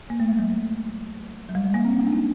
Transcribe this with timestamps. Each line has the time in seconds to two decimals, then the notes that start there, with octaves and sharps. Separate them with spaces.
0.10 A#3
0.20 A3
0.29 G#3
0.39 F#3
1.49 F#3
1.55 G3
1.64 G#3
1.74 A#3
1.85 C4
1.93 C#4
2.03 D4
2.13 D#4